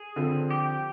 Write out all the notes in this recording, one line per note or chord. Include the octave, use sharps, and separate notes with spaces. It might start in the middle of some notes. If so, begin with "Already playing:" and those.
Already playing: G#4
D3 F3 C4
G4